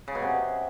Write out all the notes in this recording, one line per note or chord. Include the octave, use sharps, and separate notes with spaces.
C#3
B2
C3